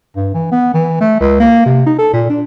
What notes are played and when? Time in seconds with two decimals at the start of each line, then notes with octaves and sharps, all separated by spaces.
0.16 G2
0.34 E3
0.52 B3
0.74 E3
1.01 A3
1.20 C#2
1.40 A#3
1.66 C3
1.86 D#4
1.98 A4
2.13 A#2
2.30 D4